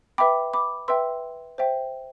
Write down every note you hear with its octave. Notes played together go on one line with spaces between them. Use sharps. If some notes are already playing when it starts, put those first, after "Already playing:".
B4 E5 G5 B5 D6
B5 D6
B4 E5 G5 C6 E6
C5 E5 G5